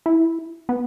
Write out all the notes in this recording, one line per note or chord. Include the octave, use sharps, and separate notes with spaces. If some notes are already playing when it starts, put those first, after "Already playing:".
E4
B3